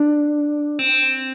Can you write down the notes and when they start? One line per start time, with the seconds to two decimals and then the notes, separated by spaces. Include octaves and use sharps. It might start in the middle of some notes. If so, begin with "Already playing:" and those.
Already playing: D4
0.79 C4